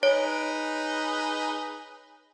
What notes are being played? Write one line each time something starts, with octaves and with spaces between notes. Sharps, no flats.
D#4 G#4 B4 C#5